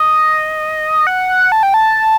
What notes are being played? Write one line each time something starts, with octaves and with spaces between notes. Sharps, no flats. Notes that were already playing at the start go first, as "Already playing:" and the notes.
Already playing: D#5
F#5
F#5
A5
G5
A5